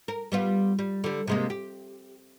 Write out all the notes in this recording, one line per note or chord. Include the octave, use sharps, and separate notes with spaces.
A#4
G3 B3 F4
G3
D3 G3
C3 G#3 A#3
G4